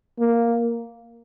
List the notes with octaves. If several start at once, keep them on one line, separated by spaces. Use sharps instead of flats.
A#3